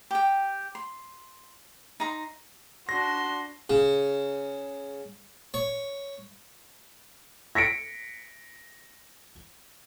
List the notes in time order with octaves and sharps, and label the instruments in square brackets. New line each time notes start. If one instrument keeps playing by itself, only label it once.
[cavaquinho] G4 G5
C6
D#4 A#5 C6
[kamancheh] D4 F#4 [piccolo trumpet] C6 [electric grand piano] A#6
[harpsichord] C#3
C#5
[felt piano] A#6 B6 C#7 D7